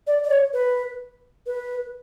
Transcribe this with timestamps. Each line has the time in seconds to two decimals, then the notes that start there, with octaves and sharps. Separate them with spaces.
0.07 D5
0.23 D5
0.30 C#5
0.54 B4
1.47 B4